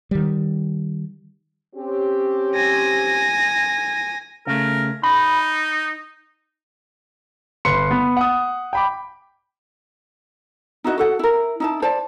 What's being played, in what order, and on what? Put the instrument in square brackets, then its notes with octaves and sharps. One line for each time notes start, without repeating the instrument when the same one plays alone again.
[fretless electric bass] D#3 G3
[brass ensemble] C4 C#4 G4
[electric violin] G#5 A#6
[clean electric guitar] C#3 A3 [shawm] A#4
[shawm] D#4 [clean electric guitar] B5
[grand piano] G1 B4 C6 C#7
B3
F#5 D#6
G5 B5 D6
[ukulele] D#4 E4 F#4 D#5
F#4 A4 F#5
E4 A#4
D#4 E4 A5
C5 D5 A5